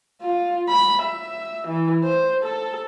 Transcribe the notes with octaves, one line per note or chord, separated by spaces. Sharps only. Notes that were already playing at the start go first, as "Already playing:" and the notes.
F4
B5
E5
E3
C5
A4